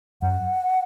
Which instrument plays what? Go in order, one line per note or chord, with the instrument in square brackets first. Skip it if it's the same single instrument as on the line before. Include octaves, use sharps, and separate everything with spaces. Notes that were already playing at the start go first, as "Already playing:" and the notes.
[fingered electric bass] F#2 [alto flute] F#5